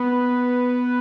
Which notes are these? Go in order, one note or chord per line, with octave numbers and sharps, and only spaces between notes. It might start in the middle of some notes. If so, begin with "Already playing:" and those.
Already playing: B3